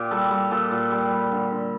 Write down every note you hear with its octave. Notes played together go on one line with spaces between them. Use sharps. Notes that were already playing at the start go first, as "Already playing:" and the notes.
Already playing: A#2 G4
G3 A4
G3
A#2 A4
A#2
G3
G3
D3
D3